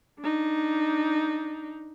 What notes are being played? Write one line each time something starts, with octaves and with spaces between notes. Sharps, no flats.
D4 D#4